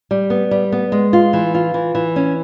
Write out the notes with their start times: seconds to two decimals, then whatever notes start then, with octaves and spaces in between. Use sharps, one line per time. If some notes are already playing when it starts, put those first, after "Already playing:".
0.11 G3
0.30 B3
0.51 G3
0.72 B3
0.92 G#3
1.13 F4
1.33 E3
1.55 F4
1.74 E3
1.95 E3
2.16 C#4